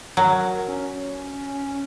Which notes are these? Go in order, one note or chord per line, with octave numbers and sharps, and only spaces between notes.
F#3 A#4
C#4